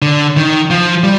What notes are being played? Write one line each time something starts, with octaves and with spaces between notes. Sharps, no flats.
D3
D#3
F3
G3